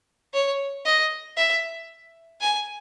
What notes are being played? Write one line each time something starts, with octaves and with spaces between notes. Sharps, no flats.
C#5
D#5
E5
G#5